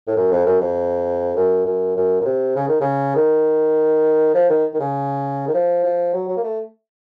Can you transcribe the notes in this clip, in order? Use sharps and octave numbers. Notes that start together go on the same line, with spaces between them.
A2
F#2
F2
F#2
F2
F#2
F#2
F#2
A#2
C3
C#3
D#3
C#3
D#3
F3
D#3
D#3
C#3
D#3
F3
F3
F#3
F#3
A#3
A3